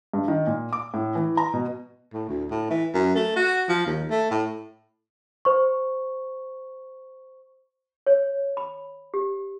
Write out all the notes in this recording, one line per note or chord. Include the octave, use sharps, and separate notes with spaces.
G2
D#3
A#2
D6
A2
E3
A#5
B2
A2
D2
A2
E3
F#2
A3
F#4
F3
D#2
A3
A2
C5 C#6
C#5
B5
G4